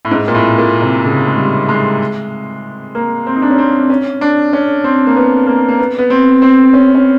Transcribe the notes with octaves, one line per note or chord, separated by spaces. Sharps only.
A2
G#2
A#2
A2
A#2
C3
C#3
G#3
G3
G#3
A#3
C4
D#4
D4
C#4
C4
C#4
D4
C#4
C4
A#3
B3
A#3
A#3
B3
B3
C4
C4
C#4
C#4